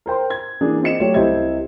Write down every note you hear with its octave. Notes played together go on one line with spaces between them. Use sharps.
A#4 C5 G5 C6
G#6
E3 A#3 D4 G#4
C4 F4 D#5 C#7 E7
F#3 A3 F4 G4 C#5 D5
C2 C3 E4 C5 D#5 G#6